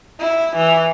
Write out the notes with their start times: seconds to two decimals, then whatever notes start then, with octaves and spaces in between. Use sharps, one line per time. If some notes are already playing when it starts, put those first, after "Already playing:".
0.20 E4
0.56 E3